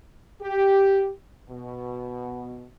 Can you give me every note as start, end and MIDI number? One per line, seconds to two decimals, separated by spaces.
0.41 1.10 67
1.49 2.66 47